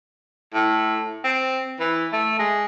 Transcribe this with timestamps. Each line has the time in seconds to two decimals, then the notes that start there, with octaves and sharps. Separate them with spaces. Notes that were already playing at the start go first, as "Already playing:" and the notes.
0.54 A2
1.24 C4
1.80 E3
2.13 A3
2.39 G#3